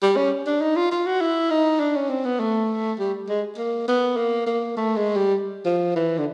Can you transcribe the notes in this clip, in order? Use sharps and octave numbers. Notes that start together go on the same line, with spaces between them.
G3
C#4
D4
D#4
F4
F4
F#4
E4
D#4
D4
C#4
C4
B3
A3
G3
G#3
A#3
B3
A#3
A#3
A3
G#3
G3
F3
E3
D3